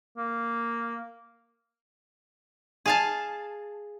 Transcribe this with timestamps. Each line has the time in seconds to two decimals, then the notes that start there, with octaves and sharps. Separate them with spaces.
0.17 A#3
2.86 G#4 F5 A5